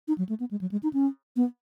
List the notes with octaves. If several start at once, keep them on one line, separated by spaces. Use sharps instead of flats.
D#4
F#3
A3
B3
G#3
F#3
G#3
D#4
C#4
B3